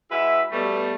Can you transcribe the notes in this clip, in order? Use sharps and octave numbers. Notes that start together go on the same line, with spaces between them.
G#3 E4 F#4 B4 E5
B2 G3 A3